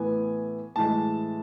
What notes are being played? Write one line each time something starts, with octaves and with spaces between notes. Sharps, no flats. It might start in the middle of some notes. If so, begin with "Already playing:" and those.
Already playing: A2 E3 B3 G#5
A2 E3 G#3 A5